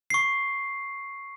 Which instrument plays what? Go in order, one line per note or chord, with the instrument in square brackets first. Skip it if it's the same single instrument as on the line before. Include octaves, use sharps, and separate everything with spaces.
[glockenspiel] C#6 C7